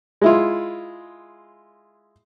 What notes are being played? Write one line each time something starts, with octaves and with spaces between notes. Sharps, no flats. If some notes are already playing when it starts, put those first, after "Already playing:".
G#3 E4 F4